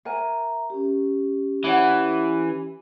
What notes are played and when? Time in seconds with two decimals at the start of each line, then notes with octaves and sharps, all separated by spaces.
0.05 A#4 E5 G#5 A#5
0.70 C#4 G4
1.64 E3 E4 C#5 F#5